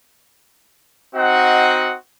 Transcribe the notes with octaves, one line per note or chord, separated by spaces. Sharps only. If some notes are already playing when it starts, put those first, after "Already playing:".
C4 D#4 F#4 D#5 F#5